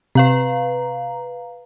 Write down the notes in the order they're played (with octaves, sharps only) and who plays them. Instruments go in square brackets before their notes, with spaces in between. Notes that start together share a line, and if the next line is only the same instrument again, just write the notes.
[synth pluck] C3 [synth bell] B4 F5 A#5